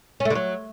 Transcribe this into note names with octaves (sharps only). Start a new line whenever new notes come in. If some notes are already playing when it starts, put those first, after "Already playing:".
C#4
A3
D3
F#3